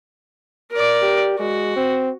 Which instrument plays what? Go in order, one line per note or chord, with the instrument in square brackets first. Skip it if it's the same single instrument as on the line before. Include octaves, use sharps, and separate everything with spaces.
[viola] A#4 D5
[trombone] G4
[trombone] G#3 [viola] F#4
[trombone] C4